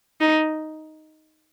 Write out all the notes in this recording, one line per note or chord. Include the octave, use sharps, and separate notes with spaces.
D#4